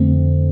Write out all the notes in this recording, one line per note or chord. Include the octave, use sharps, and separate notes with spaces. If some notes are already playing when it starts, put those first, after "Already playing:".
Already playing: F2 D3 A3 C4